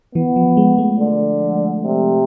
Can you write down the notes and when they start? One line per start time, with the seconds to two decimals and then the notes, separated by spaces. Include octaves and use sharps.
0.15 E3 B3
0.36 F3
0.57 G#3
0.78 A3
0.99 D3
1.83 C3